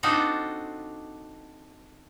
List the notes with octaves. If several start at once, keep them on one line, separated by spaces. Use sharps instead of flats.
C4 D4 D#4 F4 F#4 A4